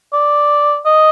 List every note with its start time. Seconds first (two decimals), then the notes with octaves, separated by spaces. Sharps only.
0.13 D5
0.86 D#5